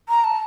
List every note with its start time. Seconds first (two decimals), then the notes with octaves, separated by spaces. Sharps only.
0.09 A#5
0.24 A5